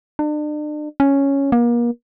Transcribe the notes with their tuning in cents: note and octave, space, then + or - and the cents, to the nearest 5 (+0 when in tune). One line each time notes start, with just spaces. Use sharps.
D4 +40
C#4 +0
A#3 +35